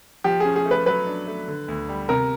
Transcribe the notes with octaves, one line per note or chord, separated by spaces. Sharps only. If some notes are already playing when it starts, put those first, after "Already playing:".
F3 G4
C#4 G#4
G#4
A3
B4
F#3 B4
D4
A3
D3
D2
G3
C3 A#4